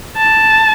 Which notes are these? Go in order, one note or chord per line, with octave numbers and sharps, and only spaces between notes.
A5